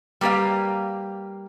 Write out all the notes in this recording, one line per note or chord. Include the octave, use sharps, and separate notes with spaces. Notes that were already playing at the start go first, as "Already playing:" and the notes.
G3 A#3 G4 B4 F5